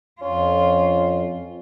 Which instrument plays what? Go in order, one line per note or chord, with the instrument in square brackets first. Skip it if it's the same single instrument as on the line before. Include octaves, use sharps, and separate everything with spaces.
[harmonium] F2 [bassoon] C#4 [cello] F4